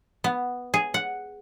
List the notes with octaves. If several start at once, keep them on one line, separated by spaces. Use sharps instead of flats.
B3
G#4
F#5